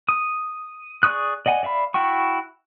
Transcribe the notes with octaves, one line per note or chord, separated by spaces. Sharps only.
D#6
G#4 D5 C#6 D#6 F#6
D5 D#5 F#5 G#5
D5 E5 F5 B5
E4 F#4 G5 C#6